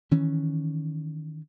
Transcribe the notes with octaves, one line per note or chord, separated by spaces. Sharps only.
D#3 E3 C#4